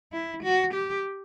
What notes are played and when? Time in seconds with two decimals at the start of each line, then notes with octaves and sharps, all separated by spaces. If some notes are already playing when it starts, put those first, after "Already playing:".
0.13 E4
0.43 F#4
0.73 G4